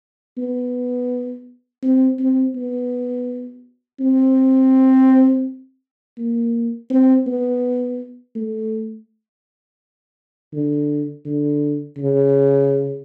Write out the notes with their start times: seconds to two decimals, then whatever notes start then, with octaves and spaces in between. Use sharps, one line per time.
0.38 B3
1.83 C4
2.19 C4
2.56 B3
4.00 C4
6.18 A#3
6.90 C4
7.27 B3
8.35 A3
10.53 D3
11.26 D3
11.98 C#3